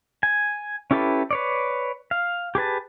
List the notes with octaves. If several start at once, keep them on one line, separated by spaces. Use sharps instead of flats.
G#5
C#4 E4 G4 A4 B4
B4 C#5 D5
F5
G4 G#4 B4 A5